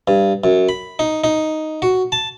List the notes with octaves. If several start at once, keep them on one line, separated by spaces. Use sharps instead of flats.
G2
F#2
B5
D#4
D#4
F#4
A5